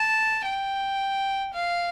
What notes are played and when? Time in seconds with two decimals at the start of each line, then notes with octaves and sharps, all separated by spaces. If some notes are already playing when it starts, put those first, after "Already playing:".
Already playing: A5
0.45 G5
1.54 F5